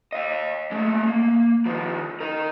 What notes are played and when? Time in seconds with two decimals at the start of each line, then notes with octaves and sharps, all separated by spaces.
0.12 D#5 F5
0.72 G#3 A3
1.07 A#3
1.66 D#3 F3
2.20 A#4 D#5